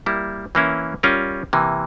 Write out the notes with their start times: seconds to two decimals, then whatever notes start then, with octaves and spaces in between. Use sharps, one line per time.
0.06 G3 A#3 E4
0.55 E3 A#3 C#4 E4
1.03 G3 C#4 F4 A#4
1.53 C3 E3 A#3